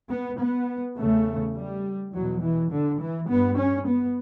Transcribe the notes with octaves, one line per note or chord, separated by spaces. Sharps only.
B3
B3
E2 C#3 A3
G3
E2 B2 F#3
E3
D3
E3
G2 B3
C#4
B3